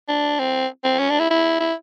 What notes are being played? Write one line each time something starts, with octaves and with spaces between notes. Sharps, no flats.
D4
C4
C4
C#4
D4
E4
E4
E4